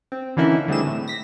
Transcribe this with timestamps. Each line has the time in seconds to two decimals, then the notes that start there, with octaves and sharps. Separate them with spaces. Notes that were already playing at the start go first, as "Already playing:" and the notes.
0.12 C4
0.37 D3 E3 A#3 C#4 D#4 E4
0.68 D3 G3 A3 C4 G#4 E7
0.87 A2
1.08 A#6 B6